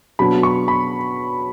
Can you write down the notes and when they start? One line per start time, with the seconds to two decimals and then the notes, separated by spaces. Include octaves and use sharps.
0.19 B2 F#3 B3 D4 B5
0.43 C#6
0.68 B5